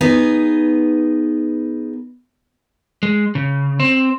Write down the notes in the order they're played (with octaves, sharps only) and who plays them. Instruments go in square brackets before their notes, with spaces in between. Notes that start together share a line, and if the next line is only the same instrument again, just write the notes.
[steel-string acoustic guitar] B3 D#4 G#4
[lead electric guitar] G#3
C#3
C4